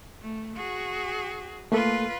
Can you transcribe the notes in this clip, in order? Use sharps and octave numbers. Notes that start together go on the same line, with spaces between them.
A3
F#4 G#4
A3 A#3 F4 A4 B4